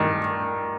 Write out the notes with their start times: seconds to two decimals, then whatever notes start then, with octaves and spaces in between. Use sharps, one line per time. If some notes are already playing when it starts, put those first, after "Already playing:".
Already playing: G2 D#3